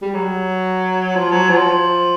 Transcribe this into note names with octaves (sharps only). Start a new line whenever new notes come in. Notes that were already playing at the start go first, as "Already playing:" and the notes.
G3
F#3
F3
F#3
F3